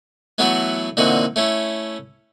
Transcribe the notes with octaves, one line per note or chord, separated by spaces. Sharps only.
E3 F#3 A3 B3 E4 F#4
A#2 D3 E3 C4 D#4 F#4
A3 C#4 E4